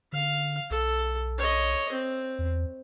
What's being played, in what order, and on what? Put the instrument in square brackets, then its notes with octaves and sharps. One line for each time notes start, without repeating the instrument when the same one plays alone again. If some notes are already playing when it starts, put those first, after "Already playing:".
[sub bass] D3 [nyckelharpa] F5
[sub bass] B1 [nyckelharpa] A4
[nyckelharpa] C#5 D#5
C4
[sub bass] E2